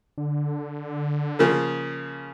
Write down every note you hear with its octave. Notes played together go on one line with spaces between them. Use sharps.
D3
C#3 F3 A#3